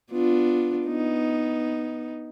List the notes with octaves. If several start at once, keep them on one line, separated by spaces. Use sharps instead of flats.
B3 D4 F4
B3 D#4